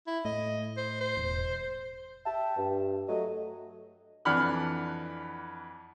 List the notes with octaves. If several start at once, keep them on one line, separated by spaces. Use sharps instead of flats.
E4
A2 D#5
C5
C5
E1
E5 G5 A5
G2
F#3 A3 D#5
F2 E3 D4 F#5 B5 F6